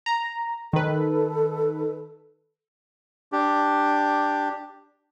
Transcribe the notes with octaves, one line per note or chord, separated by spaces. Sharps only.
A#5
D#3 A4 B4
D4 G4